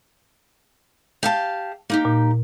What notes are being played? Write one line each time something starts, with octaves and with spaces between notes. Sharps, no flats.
G4 F5 A5
A#3 D#4 G4
A#2